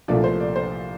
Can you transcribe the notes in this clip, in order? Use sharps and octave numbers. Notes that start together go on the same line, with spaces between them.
C2 A#2 F3 A3 D5
C5
D5
C5